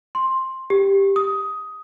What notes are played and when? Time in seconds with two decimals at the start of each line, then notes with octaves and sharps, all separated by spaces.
0.15 C6
0.70 G4
1.16 D#6